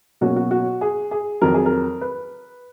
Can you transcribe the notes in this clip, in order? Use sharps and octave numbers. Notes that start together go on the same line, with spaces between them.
B2 F#3 A#3 C#4 F#4
F#4
F#4
G#4
G#4
F2 D#3 F#3 A#4
G#4
A#4
B4